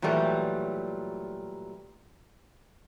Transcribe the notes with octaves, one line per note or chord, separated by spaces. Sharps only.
A#2 E3 F#3 G3 A3